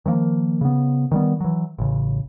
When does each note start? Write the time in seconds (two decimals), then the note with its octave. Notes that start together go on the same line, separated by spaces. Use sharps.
0.06 D#3 F3 G#3 A#3
0.61 C#3 B3
1.11 D#3 G3 B3
1.40 E3 F#3
1.78 A1 C#3